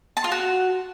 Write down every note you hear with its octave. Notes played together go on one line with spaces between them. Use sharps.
A5
F4
F#4